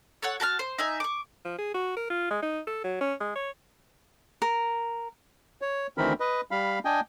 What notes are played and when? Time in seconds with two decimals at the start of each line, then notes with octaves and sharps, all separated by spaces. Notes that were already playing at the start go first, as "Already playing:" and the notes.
0.22 A4 C#5 F#5
0.40 F#4 A5 A#5 F6
0.59 C5
0.78 D#4 E5 G#5
1.00 C#6 D6
1.45 F3
1.58 G#4
1.74 F#4
1.96 A#4
2.10 F4
2.30 G#3
2.42 D#4
2.67 A4
2.84 F#3
3.01 C#4
3.20 G#3
3.36 C#5
4.42 A#4
5.62 C#5
5.98 D2 D#3 E3 C4 A#4 B5
6.20 B4 D#5
6.51 G3 F5 B5
6.85 D4 D#5 G5 G#5